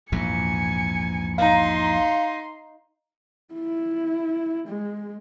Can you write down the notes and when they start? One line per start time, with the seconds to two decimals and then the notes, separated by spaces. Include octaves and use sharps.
0.12 A#1 E2 G#2 G#5 C#7
1.38 D#4 F5 A#5 C6
3.54 E4
4.68 G#3